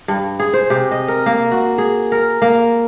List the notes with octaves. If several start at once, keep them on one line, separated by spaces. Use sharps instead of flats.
G2
G#4
C5
C3
D#5
A#4
A#3
F#4
G#4
A#4
A#3